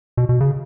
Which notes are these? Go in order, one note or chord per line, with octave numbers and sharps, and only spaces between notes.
B2
B2
C#3